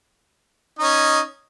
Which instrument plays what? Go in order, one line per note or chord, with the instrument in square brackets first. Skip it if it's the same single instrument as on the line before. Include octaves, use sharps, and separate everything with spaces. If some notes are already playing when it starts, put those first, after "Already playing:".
[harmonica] C#4 D#4 D#5